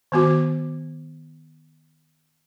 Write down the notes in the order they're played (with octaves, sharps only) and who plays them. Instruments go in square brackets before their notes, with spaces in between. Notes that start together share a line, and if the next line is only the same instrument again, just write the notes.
[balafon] D#3 B3 F#4